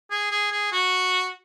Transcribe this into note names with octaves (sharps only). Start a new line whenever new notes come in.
G#4
G#4
G#4
F#4